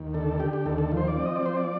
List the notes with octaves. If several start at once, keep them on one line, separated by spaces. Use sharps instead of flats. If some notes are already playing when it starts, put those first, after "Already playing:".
Already playing: D#2
D3 A4
D3 G4
G4
D#2 A4
A4
F3
C5
D5
C4
D#5
D5
F3 C5
D5